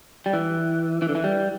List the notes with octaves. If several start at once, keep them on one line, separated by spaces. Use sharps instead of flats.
G3
E3
E3
D3
E3
G3